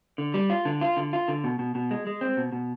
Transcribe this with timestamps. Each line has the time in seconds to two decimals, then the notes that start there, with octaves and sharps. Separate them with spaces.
0.18 D3
0.34 G3
0.50 F4
0.65 D3
0.81 F4
0.97 D3
1.13 F4
1.28 D3
1.44 B2
1.59 B2
1.75 B2
1.91 G#3
2.07 G#3
2.21 C4
2.37 B2
2.53 B2